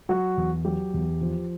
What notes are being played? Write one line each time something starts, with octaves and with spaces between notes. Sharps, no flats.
F#3 F#4
E2
F#3 G4
E2
F3